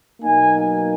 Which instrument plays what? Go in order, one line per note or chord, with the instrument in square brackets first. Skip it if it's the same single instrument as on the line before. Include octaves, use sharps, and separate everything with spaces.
[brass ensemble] B2 F#3 A#3 D#4 G#5